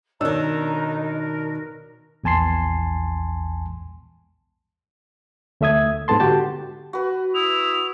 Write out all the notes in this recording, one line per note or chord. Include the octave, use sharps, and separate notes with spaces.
B2 D#3 D4 D#4 A#4 C#5 A#5 E6
A#4
A#1 E2 G#5 A5 C6 C7
D2 A3 E5 D#6 G#6
G#2 B3 A4 A5 C6
D3 F#4 G4 G5 A5
F#4 B4
E4 D#6 F7